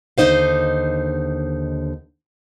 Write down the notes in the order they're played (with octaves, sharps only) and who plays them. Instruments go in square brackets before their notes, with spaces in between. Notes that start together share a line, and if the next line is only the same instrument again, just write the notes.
[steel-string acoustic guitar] D#2 D3 D#4 C5 F5